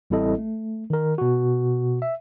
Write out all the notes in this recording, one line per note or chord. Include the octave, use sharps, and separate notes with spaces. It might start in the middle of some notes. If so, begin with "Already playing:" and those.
A1 G3 C4 E4 A4 D#5
A3
D#3 A#4
B2 F#4
E5